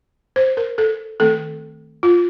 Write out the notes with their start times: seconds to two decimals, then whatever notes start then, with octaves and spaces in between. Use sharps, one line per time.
0.36 C5
0.57 A#4
0.78 A4
1.20 D#3 A3 C4 A4
2.03 F4